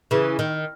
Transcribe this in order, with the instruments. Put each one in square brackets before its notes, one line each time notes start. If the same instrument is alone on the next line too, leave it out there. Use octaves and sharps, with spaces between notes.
[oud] C#3 E3
D#3